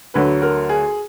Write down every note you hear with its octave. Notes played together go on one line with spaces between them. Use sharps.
D2 D3 F#3 B4
A#4
G#4